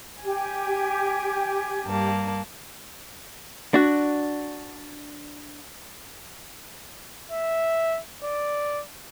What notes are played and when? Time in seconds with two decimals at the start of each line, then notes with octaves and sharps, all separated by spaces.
0.23 G4 G#5
1.86 G2 A#3 A5
3.74 D4 F#4
7.31 E5
8.23 D5